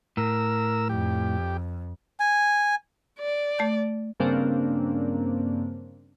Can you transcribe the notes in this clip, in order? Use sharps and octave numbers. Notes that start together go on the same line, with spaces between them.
A2 A#4 E6
F2 G4
G#5
D5
A3 A5 G6
G2 C#3 A#3 C4 D4